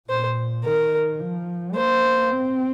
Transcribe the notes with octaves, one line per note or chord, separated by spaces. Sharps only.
A#2 C5
D#3 A#4
F3
A#3 C5
C4